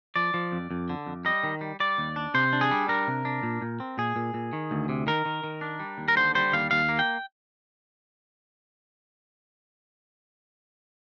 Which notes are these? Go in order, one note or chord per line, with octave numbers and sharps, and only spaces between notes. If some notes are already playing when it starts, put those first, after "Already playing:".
F3 D5
F3
F2
F2
D3
F2
G3 D#5
D#3
G3
G3 D5
D#2
D4
C3 C5
D4
G#4
G3
D4 A#4
C3
D4
A#2
A#2
C4
A#2 G#4
A#2
A#2
D#3
D2
C3
D#3 A#4
D#3
D#3
D4
G3
D#2
A#4
D3 C5
G3 C5
D#2 F5
D#2 F5
A#3
G5